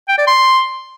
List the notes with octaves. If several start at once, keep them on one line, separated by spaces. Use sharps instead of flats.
G5
D5
C6